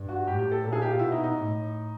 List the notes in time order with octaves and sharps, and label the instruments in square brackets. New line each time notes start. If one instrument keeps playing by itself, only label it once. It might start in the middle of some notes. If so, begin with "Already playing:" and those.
Already playing: [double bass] G2
[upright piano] F#4
[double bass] A2 [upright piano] G4
[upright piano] G4
A4
[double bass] A#2 [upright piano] A4
[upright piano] G#4
G4
F4
[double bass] B2 [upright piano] E4
[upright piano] D#4
D#4
[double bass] A2